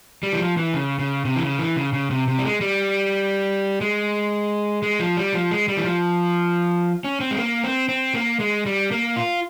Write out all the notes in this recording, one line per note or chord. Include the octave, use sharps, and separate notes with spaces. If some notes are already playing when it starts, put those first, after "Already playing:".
G3
E3
F3
E3
C#3
C#3
C3
E3
C#3
E3
C#3
C#3
C3
C3
G3
G#3
G3
G#3
G#3
F3
G3
F3
G#3
G3
E3
F3
C#4
C4
G#3
A#3
C4
C4
A#3
G#3
G3
A#3
F4